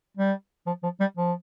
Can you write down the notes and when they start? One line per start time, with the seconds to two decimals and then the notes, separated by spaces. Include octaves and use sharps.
0.17 G3
0.66 F3
0.83 F3
1.00 G3
1.17 F3